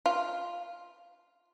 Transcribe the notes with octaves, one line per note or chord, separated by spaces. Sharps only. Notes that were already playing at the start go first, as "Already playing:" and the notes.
F4